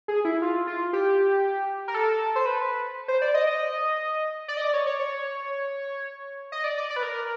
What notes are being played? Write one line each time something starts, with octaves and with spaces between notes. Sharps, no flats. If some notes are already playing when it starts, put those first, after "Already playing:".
G#4
E4
F4
F4
G4
A#4
A4
C5
B4
C5
D5
D#5
D#5
D5
D#5
D5
C#5
C#5
C#5
D#5
D5
D5
D5
B4
A#4